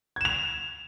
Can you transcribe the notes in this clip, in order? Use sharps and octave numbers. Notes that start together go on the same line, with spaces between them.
G#6 E7 F7